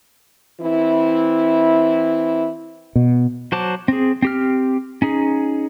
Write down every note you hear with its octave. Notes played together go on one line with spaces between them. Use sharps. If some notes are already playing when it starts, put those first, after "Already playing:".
E3 C4 E4
B2
F#3 F#4 C5 A5 D6
C4 G#4
C4 G4 F6
C#4 D#4 G#4